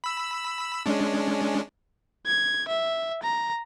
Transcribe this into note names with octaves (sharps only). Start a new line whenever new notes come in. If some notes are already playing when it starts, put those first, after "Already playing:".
B5 E6
G#3 C#4 D4
G#6
E5
A#5